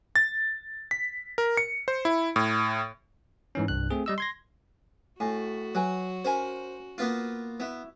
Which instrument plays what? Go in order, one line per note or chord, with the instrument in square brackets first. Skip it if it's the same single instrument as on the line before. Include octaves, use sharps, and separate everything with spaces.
[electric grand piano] A6
B6
A#4
C#7
C5
E4
A2
[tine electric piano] G#2 E3 C#4
C2 G2 F#6
A3 C4 G#4
G3 D#5 E6
C6 G#6 A#6
[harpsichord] A2 [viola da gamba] F#4 [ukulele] G#5
[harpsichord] F#3 [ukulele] B4 G#5
[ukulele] C#4 A#4 G#5 [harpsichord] C5
[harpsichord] A#3 B3 F4
[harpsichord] B3 [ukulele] E4 F#4 E5